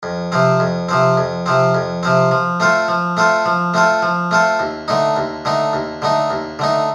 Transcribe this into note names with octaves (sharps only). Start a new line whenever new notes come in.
F2
C3 F3 C4
F2
C3 F3 C4
F2
C3 F3 C4
F2
C3 F3 C4
F3
A3 C4 F4 A4
F3
A3 C4 F4 A4
F3
A3 C4 F4 A4
F3
A3 C4 F4 A4
D#2
D3 A3 D#4
D#2
D3 A3 D#4
D#2
D3 A3 D#4
D#2
D3 A3 D#4